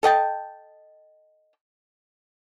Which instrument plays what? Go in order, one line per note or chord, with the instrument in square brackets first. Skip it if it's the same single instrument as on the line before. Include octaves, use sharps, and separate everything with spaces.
[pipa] A4 D#5 G5 A5